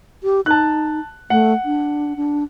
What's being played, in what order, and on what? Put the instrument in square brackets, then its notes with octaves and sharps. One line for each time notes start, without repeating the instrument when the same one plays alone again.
[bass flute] G4
[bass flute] D#4 [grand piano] A5 F#6
[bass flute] A3 [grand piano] F#5
[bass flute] D4
D4